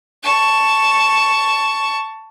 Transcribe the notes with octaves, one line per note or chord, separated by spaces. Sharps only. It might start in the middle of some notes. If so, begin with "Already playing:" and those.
A5 C#6